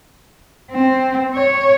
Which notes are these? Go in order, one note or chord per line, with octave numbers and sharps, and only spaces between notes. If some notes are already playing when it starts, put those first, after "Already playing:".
C4
C#5